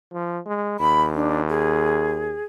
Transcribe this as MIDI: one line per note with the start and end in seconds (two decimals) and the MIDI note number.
0.13 0.39 53
0.46 0.78 56
0.80 2.39 39
0.80 1.03 83
1.14 1.41 62
1.49 2.44 68